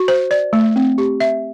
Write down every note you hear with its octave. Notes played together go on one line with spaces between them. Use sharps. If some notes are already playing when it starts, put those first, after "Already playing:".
Already playing: F#4
C5
D5
A3
C4
G4
E5